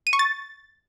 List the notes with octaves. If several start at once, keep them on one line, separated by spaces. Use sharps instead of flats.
D#7
C#6
A6